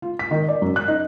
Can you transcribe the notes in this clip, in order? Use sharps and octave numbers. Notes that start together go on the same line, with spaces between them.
F4
B6
D#3
D5
F#2
F#6
D#4